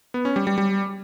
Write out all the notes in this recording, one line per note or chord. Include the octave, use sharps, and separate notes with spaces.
B3
C#4
G3
G3
G3